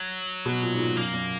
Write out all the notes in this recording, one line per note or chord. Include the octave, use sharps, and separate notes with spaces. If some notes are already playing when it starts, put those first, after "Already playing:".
Already playing: F#3
B2
A#2
G#2
A#2
F#2 A#3
F#2